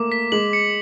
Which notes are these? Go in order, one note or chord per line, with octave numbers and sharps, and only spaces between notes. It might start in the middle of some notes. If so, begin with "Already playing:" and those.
Already playing: A3 A#3 D6
B6
G#3 F#7
C#7